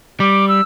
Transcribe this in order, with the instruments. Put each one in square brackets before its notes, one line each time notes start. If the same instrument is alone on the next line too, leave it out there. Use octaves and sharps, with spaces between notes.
[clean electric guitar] G3 [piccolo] D6
[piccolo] E6